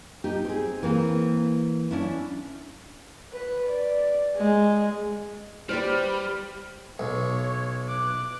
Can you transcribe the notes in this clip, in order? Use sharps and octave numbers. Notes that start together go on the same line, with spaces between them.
D#4 G4
C4 G#4
E3 A#3 C4
C#4 D4 E4
B4
D5
G#3
G3 G4 B4 C5 D5 F6
B1 C#5
D6 F#6